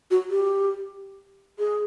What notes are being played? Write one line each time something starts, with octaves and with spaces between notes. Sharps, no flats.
F#4
G4
G#4